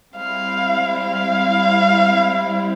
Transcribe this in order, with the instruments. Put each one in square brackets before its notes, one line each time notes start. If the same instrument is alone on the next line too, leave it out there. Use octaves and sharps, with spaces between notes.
[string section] G3 C4 E4 [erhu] F5
[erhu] F5